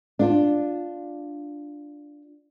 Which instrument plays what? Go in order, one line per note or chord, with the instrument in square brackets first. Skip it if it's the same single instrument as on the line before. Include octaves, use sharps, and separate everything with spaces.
[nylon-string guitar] D4 F4